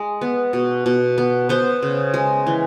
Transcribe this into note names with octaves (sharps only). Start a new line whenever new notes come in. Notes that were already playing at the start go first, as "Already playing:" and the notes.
Already playing: G#3
B3
B2
B2
B3
B3 C5
C#3
G#3
E3